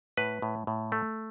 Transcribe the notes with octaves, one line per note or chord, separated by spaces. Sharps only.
A2 B4
A2
A2
A3